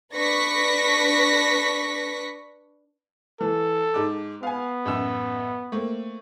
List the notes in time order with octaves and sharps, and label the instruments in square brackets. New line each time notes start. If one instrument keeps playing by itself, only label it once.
[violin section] D4 B4 C#6 A#6 B6
[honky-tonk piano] E3 [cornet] A4
[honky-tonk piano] G#2 D6
[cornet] B3 [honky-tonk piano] F5 G#5
[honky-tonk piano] A1 F#2 E6
A3 A#3 C4